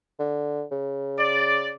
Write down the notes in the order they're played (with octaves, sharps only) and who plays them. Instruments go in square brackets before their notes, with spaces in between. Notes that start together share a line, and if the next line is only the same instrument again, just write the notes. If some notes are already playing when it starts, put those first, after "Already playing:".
[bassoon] D3
C#3
[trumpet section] D5